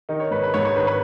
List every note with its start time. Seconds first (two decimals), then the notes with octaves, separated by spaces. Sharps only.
0.09 D#3 D#4
0.20 C#5
0.31 G#2 B4
0.43 B4
0.54 G#2 C#5
0.65 C#5
0.76 D#3 B4
0.87 B4